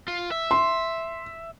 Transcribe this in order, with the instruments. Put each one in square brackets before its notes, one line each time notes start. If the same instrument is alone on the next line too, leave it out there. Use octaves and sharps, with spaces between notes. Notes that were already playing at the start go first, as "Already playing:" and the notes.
[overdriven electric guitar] F4
E5
[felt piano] C6